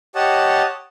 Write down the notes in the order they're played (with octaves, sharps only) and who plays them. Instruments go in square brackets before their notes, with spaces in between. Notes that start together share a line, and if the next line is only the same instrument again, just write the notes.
[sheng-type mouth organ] G4 C#5 D#5 F#5 A5